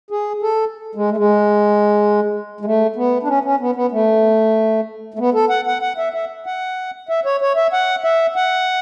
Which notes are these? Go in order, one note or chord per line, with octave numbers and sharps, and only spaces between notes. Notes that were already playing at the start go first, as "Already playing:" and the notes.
G#4
A4
G#3
A3
G#3
G#3
A3
B3
D4
C#4
C#4
B3
B3
A3
A3
B3
A4
F#5
F#5
F#5
E5
E5
F#5
E5
C#5
C#5
E5
F#5
E5
F#5